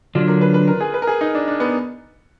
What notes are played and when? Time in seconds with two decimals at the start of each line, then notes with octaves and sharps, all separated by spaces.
0.15 D3 F#3 D4 F4
0.28 A#4
0.41 B4
0.54 B4
0.68 A#4
0.81 G#4
0.94 B4
1.02 A#4
1.07 G#4
1.21 D#4
1.35 D4
1.48 D4
1.60 B3